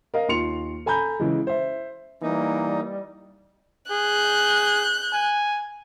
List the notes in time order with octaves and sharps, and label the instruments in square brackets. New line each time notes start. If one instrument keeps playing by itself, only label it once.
[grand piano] A#4 D#5 F5
D#2 F4 C6 C#7 F7
A4 G#5 A#5 B5 G6
C#3 E3 G#3
C5 E5
[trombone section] E3 A#3 [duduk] G3 [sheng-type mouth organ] D#4
[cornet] G#4 [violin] F#6 G6
[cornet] G#5